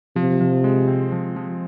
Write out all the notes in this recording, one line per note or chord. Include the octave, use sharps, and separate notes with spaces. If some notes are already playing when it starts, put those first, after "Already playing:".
C3 F3
F3
G#3
C4
F3
F3